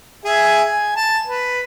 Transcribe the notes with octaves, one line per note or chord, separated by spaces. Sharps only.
G#4 E5 G#5
G#5
A5
B4